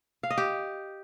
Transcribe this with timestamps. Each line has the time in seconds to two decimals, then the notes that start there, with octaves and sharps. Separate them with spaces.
0.23 F5
0.30 D#5
0.38 G4